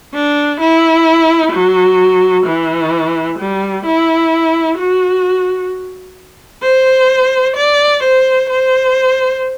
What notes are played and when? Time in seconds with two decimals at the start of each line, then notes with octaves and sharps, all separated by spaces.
0.14 D4
0.61 E4
1.52 F#3
2.46 E3
3.39 G3
3.85 E4
4.78 F#4
6.63 C5
7.56 D5
8.03 C5
8.49 C5